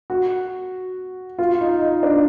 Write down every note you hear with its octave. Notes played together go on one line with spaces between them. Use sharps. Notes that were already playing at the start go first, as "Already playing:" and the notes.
F#4
F4
D#4
D#4
D4